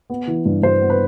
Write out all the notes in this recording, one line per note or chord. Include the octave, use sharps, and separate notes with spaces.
B3
E3
G2
G2 C5
B3
B4